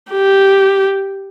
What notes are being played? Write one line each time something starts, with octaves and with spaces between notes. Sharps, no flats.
G4